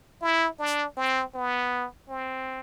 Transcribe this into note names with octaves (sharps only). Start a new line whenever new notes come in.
E4
D4
C4
B3
C4